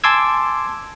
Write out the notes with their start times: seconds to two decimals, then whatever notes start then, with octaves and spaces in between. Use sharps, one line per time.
0.04 G#5 A5 C6 D6 E6 G#6